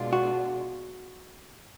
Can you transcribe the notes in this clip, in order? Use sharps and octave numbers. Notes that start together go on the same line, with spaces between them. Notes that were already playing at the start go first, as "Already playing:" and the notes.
Already playing: B2 G#3 D4 F4
F#4